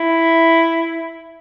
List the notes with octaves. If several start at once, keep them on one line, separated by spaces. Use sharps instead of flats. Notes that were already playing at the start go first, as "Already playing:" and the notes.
Already playing: E4